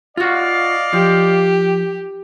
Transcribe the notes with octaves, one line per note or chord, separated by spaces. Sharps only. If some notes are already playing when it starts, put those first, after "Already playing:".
F4 F#4 D5 D#5 F5
F3 G4